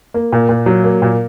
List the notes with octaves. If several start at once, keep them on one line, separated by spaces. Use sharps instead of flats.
A#3
A#2
A#2
F#3
A#3
A#2